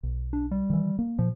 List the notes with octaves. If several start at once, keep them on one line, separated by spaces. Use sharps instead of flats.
B1
D4
G3
D#3 E3
A#3
A#2 F3